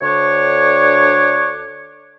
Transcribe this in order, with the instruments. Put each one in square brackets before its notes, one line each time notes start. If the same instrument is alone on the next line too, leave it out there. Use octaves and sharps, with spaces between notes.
[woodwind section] D2 D3 D4 C#5